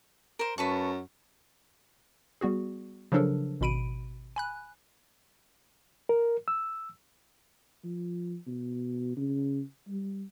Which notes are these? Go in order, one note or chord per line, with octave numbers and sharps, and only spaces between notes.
A#4 C5
F#2 B4 A5 C#6
G3 B3 F#4 G#4
C#3 F3 F#3 D4 A4 A#4
G#1 B2 B5 D7 D#7
G#5 B5 F#6
A#4
E6
F3
B2
C#3
G3